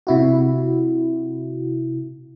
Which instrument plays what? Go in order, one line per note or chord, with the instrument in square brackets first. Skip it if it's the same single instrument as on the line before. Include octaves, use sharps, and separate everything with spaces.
[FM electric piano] C3 E4 F#4